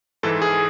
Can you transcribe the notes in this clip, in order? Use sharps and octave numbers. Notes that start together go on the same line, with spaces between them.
G#2 E3 A4
G#4